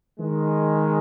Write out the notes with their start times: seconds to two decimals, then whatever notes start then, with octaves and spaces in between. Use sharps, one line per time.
0.19 D#3 G#3